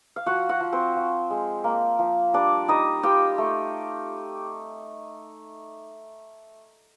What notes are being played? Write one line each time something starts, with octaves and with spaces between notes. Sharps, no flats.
F5
F3 F#4 F#5
F#4 F#5
F3
C4 C5
F3
G#3
A#3
F3
G3 D4 D5
G3 D#4 D#5
F4 G4 G5
A3